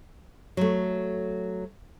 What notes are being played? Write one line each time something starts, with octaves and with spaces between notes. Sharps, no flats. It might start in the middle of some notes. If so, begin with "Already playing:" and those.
F#3 A3